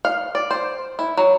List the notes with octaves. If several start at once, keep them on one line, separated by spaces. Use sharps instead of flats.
F5
D5
C5
E4
F#3